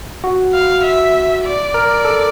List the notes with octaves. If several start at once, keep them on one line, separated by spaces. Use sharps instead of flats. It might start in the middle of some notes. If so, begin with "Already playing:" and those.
F#4
F5
E5
D5
A#4
A4